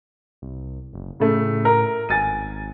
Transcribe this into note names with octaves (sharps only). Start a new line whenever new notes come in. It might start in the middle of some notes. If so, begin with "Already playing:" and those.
C2
F#1
A2 C#3 A3
A#4
G#1 G#5 A6 D#7